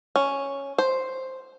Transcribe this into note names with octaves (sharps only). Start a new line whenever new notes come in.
C#4
C5